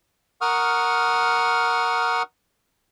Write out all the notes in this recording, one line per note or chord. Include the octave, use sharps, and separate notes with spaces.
A#4 F#5 C#6 D#6 F6